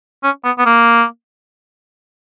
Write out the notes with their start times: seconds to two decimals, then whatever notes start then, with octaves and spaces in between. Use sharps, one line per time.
0.24 C#4
0.45 B3
0.58 B3
0.66 A#3